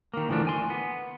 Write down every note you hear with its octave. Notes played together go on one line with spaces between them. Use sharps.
D#3 A#3
D2 E3 F3 A3 D4
G#5 C6
B3